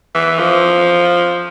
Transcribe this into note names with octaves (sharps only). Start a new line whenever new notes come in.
E3
F3